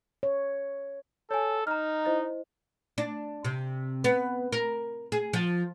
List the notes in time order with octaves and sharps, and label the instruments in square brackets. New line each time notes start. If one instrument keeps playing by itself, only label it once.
[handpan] C#5
[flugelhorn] A4 [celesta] C#5 G#5
[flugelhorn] D#4 [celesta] A#5 F6
[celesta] E4 C5 D#5
[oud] D4
C3
B3
A#4
G#4
F3